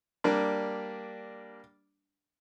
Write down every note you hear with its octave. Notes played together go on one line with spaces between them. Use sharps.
G3 A#3 D4